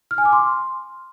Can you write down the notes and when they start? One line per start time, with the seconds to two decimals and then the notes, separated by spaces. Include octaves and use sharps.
0.11 F6
0.18 G#5
0.25 D6
0.33 C6